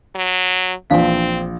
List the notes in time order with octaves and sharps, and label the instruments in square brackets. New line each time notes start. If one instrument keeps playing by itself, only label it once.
[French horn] F#3
[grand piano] A#1 [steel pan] E3 D4 [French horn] C4 [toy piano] F5